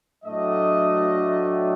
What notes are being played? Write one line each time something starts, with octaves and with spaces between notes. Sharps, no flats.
A2 F#3 A3 D4 D#5